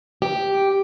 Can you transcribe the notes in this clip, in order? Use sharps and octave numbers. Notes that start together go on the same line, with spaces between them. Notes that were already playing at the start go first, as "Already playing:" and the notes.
G4